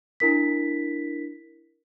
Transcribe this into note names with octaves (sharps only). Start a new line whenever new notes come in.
D4 E4 A#4 B6